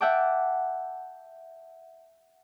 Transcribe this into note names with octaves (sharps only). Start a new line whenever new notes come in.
E5 F#5 G5 A5 D6